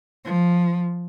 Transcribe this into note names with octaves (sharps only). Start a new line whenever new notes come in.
F3